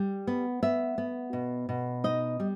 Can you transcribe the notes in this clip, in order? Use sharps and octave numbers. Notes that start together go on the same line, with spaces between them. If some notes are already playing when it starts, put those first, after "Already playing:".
Already playing: G3
B3
B3 E5
B3
B2
B2
D#4 D#5
G3